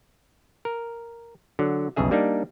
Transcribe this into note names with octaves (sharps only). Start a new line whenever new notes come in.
A#4
D3 F#3
B1 F2 C#3 G#4 E5
G3 A#3 D4 D#4